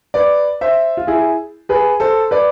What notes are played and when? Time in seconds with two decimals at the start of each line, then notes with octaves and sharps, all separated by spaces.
0.14 B4 D5
0.61 C5 E5
0.97 F4
1.07 E4 G#4
1.69 G#4 B4
2.00 A4 C5
2.31 B4 D5